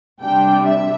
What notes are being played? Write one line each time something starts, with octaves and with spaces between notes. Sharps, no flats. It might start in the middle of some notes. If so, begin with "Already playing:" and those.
C3 G3 D4 G5
E5